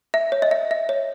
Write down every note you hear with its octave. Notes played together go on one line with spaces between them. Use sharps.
E5
C#5
D#5
E5
E5
C#5